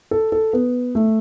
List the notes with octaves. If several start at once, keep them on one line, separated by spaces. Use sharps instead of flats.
A4
A4
B3
A3